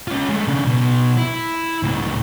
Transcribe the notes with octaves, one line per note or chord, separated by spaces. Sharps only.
C#4 F4
G#3 A3
C#3 D4
B1 B2
E4
C#2 A2